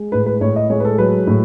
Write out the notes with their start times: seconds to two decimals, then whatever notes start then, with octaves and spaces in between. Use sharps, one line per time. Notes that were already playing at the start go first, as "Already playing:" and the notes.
Already playing: G#3
0.12 A2 B4
0.26 B4
0.41 A2 C#5
0.56 D#5
0.70 G#3 C#5
0.80 B4
0.85 A4
0.98 F#3 B4
1.27 A2